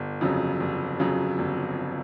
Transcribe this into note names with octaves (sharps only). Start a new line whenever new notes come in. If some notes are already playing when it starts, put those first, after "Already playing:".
Already playing: G1
F2 C#3 F#3
G1
F2 C#3 F#3
G1